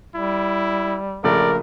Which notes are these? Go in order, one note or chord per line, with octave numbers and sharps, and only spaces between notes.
G3 E4
A#1 C#3 A3 A#4 D5